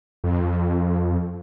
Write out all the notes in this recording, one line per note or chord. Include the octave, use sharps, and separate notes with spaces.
F2